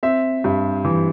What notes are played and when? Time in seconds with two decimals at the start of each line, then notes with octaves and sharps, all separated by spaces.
0.03 C4 E5
0.44 G2
0.85 E3